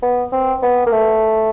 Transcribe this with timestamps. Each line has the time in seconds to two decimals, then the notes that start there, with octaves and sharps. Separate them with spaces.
0.03 B3
0.32 C4
0.62 B3
0.87 A#3
0.92 A3